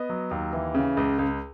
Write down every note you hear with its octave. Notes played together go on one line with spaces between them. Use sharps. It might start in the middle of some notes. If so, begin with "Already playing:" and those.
Already playing: B3 D#5
F#3
D#2
E3
C#3
C#2
C#2